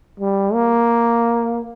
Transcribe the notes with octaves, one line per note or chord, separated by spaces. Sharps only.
G3
A#3